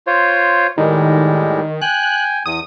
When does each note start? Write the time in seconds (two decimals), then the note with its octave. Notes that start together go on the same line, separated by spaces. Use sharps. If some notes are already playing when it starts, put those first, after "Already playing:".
0.07 F4 C5 C#5
0.78 A2 D#3 G3 G#3
1.82 G5 G#5 F#6
2.46 E2 D#6